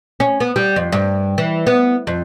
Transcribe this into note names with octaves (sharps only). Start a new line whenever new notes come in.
C#4
B3
G3
F2
G2
E3
B3
F2